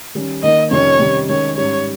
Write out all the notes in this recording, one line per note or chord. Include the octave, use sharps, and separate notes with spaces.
D#3 G3 C#4
D#3 A#3 D#4 D#5
F2 C3 D#3 G3 C#4 C#5
C3 D#3 G3 C#4
D#3 G#3 C#4 C#5
G#2 G3 C#4 C#5